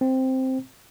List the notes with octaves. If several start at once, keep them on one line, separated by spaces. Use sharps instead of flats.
C4